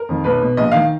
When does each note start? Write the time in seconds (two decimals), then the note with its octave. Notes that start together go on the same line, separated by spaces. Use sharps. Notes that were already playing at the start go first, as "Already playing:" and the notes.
Already playing: A#4
0.09 F2 D#3
0.24 B1 B4
0.41 B2
0.57 A#1 D#5
0.72 D#3 F5